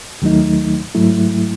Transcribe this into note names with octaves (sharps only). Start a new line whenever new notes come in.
D#2 D#3 F#3 A3 D#4
G#2 F#3 A3 E4